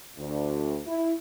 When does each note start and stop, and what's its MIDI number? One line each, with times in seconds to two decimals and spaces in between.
0.18 0.79 38
0.86 1.12 64